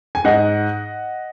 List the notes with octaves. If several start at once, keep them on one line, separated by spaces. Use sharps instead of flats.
G#5
G#2 D#5 F#5